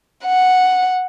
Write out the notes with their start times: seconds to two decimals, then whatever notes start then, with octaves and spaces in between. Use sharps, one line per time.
0.25 F#5